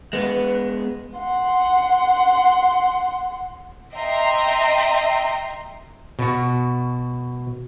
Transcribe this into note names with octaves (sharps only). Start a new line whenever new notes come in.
G#3 B3 B4
F#5 C6
D#5 E5 G5 A#5 C6
B2 F#4